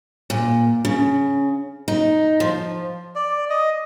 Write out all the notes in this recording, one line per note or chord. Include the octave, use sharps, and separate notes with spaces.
A#2
C#3
D#4
F3
D5
D#5